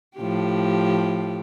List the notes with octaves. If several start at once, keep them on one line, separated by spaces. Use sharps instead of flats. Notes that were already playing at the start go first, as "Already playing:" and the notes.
A2 F3 G4